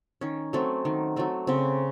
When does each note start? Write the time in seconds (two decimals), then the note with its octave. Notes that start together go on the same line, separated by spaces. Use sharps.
0.21 D#3 C#4
0.53 F#3 A3 C4
0.85 D#3
1.16 F#3 A3 C4
1.47 C#3 C4